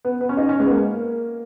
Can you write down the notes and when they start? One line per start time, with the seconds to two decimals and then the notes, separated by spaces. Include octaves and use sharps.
0.05 B3
0.21 B3
0.29 C#4
0.37 D#4
0.49 C#4
0.60 G#3
0.66 B3
0.71 A#3